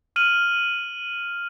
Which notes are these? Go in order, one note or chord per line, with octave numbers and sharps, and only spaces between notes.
F6 D#7 F#7